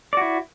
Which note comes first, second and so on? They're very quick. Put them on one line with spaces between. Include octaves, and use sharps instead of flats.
D5 F#4 E4